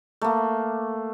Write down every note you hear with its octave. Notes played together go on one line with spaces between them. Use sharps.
A3 A#3